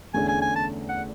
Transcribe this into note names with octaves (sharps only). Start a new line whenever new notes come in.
E2 D3 A3 C#4 G#4 G#5
G#5
G#5
A5
F#5